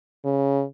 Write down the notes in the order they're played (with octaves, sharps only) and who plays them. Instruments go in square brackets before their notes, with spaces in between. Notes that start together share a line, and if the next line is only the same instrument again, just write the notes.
[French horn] C#3